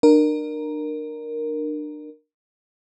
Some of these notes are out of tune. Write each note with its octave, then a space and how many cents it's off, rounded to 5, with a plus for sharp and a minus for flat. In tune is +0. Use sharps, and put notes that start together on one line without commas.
D4 +35 A#4 +0